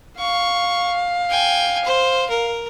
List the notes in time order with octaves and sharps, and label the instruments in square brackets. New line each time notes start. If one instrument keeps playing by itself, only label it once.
[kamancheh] F5 [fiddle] C#6
[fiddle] G5 G#5
C5
A#4